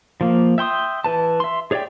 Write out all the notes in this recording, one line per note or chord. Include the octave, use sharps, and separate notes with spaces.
F3 A#3
E5 G5 C6 D#6
E3 B4 A5
E5 C6
G#4 C#5 D5 E5 G5